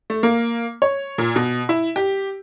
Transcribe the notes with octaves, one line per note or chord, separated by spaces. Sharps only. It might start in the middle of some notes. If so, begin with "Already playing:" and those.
A3
A#3
C#5
A#2
B2
E4
G4